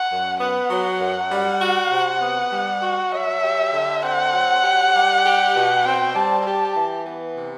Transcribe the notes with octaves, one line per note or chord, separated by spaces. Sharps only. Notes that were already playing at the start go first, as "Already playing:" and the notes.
Already playing: F#5
F#2
B3 F#5
F#3
F#2
G3
F#4
C3
B3
G3
F#4
F#3 E5
G4
D3
C4 F#5
F#3
G4
G3
G4
B2
C4 G5
G3 A5
G4 A5
E3
B3
C3